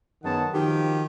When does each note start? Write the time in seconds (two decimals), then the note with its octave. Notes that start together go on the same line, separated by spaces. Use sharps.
0.23 F#2 D#3 B3 G#4 F#5 A5
0.53 D#3 F3 F#4 G4